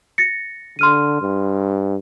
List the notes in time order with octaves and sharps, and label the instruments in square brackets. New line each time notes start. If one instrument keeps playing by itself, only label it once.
[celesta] A6 A#6 C#7
[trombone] D3 [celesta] C6 F6 D#7
[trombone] G2